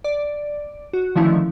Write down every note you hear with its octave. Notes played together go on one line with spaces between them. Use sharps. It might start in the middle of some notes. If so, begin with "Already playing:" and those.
D5
F#4
D3 D#3 F3 A3 C#4 E4